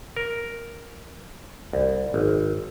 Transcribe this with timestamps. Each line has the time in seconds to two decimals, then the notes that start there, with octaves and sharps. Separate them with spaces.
0.17 A#4
1.73 C2
2.14 G#1